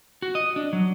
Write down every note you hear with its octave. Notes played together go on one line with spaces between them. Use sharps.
F#4
D#5
D4
F#3